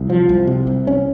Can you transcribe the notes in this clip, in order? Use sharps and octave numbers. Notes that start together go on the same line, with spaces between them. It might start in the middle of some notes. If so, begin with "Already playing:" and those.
Already playing: C2
F3
C2
C3
C2
C#4